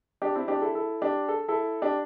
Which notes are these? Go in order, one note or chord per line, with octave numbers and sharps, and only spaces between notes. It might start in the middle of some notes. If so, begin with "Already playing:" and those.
D4 G4
C4 E4
D4 G4
E4 A4
E4 A4
D4 G4
A4
E4 A4
D4 G4